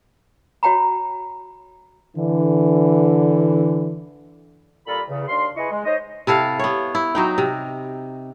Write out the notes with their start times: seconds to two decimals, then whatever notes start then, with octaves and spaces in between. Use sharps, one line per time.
0.63 F#4 C#5 G5 A#5 B5
2.16 D3 E3
4.87 A#2 G3 F4 A4 A#5 B5
5.08 E2 C#3
5.28 D#2 D4 F5 C6
5.56 E4 G#4 B4 D#5 C#6
5.71 G#3
5.85 D#4 C5 C#5 D#5
6.27 C3 E4 A4 F5
6.59 B3 C#5
6.95 E4
7.15 F#3 D#4 G5
7.38 C3